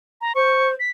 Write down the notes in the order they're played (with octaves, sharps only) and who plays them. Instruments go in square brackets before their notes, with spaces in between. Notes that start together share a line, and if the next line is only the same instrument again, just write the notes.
[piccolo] A#5
[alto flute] C5 [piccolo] C#6
[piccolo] B6